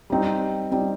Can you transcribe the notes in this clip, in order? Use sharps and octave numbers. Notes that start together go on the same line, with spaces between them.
G3 C4 D#4
G3 C4 D#4